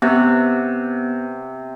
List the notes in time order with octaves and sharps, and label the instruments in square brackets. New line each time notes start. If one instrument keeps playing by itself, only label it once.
[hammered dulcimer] C3 [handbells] B3 F#6